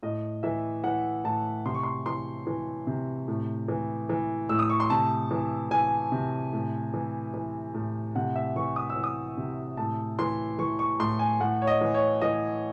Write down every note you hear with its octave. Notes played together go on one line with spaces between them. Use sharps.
A2 D#5
E3 E5
E3 F#5
A2 A5
C3 C6
C#6
C6
E3 C6
E3
C3
A2
E3
E3
A2 E6
D#6
C#6
C6
C3 A5
E3
E3 G#5
C3
A2
E3
E3
A2
C3 F#5
E5
E3 C#6
D#6
E6
E3
D#6
C3
A2 A5
E3 C6
E3 C#6
C#6
A2 C6
G#5
A2 F#5
C#5
D#5
E3
C#5
E3 D#5